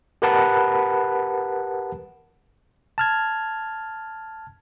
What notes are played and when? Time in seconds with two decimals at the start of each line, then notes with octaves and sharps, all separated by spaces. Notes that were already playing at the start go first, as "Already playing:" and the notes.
0.22 G4 A#4 B4 F#5 A5 B5
2.98 A5 F6 G#6